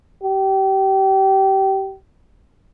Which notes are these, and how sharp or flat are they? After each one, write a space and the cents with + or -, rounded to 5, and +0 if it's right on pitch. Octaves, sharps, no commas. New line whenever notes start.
G4 -25